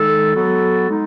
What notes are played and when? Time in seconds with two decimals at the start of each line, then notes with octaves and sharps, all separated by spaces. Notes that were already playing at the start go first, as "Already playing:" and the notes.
Already playing: D#3 G#3 D#4 A4
0.35 F#3 B3 F#4 A4
0.89 G#3 D#4